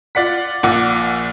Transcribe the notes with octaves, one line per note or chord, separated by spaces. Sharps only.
F4 D5 F#5 B6
A#1 A#2 F3 F#5 D6